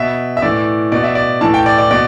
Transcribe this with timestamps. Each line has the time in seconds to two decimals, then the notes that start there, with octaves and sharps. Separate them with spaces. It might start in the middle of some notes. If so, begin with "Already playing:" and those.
Already playing: B2 E5
0.37 E5
0.42 A2 E3 D5
0.92 B2 D5
1.04 E5
1.15 D5
1.41 A2 E3 A5
1.54 G5
1.66 D5
1.78 D5
1.91 B2 D5